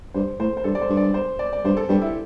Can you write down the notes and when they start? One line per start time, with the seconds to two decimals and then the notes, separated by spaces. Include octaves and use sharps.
0.14 G2 C5
0.39 A2 C5
0.57 C5
0.64 G2 A4
0.75 D5
0.82 C5
0.89 G2
0.97 D5
1.14 C5
1.39 D5
1.53 D5
1.64 G2 C5
1.77 A4
1.89 G2 G4
2.02 E4